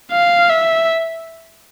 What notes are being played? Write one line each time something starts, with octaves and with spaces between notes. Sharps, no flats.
F5
E5